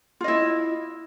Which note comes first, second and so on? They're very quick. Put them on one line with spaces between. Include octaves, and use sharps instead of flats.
F4 D#5 E4